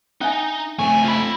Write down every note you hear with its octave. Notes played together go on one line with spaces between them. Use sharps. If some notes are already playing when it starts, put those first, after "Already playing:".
C#4 D#4 E5 G#5
A3 C4 G#5 C#6
F4 B5